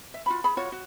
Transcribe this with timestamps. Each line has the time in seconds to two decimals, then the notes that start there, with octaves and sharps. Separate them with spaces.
0.14 E5
0.26 F4 F#4 B5
0.44 G#4 B5
0.57 F4 F#4 C#5
0.72 F#4